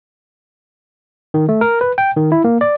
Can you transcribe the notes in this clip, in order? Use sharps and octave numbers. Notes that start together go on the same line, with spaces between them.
D#3
A3
A#4
B4
G5
D#3
E4
A#3
D5